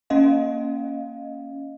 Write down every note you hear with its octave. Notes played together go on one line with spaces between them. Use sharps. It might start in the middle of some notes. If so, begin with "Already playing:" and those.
A#3 C#4 D#5 F5